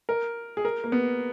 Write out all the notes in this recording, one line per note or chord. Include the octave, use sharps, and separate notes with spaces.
A#4
G#4
A#4
A#3
B3